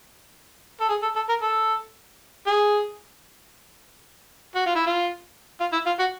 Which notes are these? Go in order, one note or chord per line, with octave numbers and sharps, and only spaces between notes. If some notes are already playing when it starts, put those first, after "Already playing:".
A4
G#4
A4
A4
A#4
A4
G#4
F#4
F4
E4
F4
F4
E4
F4
F#4